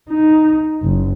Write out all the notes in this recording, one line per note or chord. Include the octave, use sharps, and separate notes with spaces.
D#4
F#1